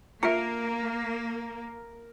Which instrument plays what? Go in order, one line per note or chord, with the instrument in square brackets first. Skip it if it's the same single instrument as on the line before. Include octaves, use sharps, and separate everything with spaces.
[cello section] A#3 [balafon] F4 E5 [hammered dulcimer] A#4